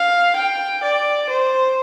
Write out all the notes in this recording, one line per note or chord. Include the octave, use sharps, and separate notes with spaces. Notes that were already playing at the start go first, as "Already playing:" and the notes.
Already playing: F5
G5
D5
C5